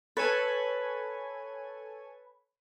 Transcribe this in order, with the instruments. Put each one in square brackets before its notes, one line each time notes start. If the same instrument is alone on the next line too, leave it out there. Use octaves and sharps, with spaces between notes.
[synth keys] A4 C#5 G#5 [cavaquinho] B4